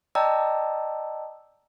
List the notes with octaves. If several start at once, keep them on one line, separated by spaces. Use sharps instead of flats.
D5 D#5 G5 A5 A#5 E6